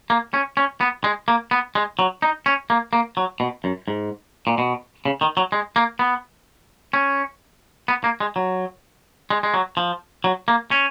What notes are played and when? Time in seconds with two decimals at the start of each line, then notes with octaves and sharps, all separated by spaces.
0.10 A#3
0.34 C#4
0.57 C#4
0.81 B3
1.04 G#3
1.28 A#3
1.51 B3
1.75 G#3
1.99 F#3
2.22 D#4
2.46 C#4
2.70 A#3
2.93 A#3
3.17 F#3
3.40 B2
3.64 F#2
3.88 G#2
4.47 A#2
4.58 B2
5.05 C#3
5.21 D#3
5.37 F#3
5.52 G#3
5.76 A#3
5.99 B3
6.93 C#4
7.88 B3
8.04 A#3
8.20 G#3
8.36 F#3
9.30 G#3
9.43 G#3
9.54 F#3
9.77 F3
10.24 F#3
10.48 A#3
10.71 C#4